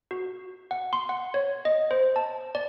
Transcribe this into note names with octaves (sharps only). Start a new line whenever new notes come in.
F#4
F#5
C6
F#5
C#5
D#5
C5
A5
D5